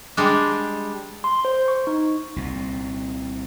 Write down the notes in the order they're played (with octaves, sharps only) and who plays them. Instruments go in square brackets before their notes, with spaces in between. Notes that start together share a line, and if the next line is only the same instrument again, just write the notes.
[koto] G3 G#3 D4
[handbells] C6
C5
C#6
D#4
[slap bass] C2 A#2